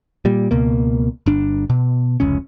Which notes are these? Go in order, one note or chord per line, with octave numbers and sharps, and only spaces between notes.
A#2 G3
C#2 B2 A#3
G1 D4
B2
F1 C#2 C#4